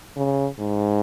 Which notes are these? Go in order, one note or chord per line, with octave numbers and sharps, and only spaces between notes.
C#3
G#2